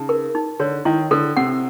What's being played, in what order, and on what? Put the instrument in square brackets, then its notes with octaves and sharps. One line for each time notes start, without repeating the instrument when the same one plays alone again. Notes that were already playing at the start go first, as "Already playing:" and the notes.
Already playing: [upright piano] C#3 [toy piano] D#4
[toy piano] A#4
D#4
[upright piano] D3 [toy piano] C#5
[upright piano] D#3 [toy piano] E4
[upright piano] D3 [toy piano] A4
[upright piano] C3 [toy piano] F#5